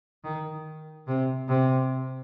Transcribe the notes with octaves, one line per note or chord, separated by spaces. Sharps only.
D#3
C3
C3